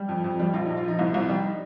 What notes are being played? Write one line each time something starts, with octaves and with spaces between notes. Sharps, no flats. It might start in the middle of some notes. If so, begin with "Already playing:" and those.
Already playing: G3
F2
F2
G3
A#1 F4
D#4
A#1
F4
F3 D#4
C2
C2
G3
D#4